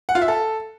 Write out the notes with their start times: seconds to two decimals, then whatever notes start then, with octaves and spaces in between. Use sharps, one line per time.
0.09 F#5
0.15 F4
0.22 E5
0.28 A4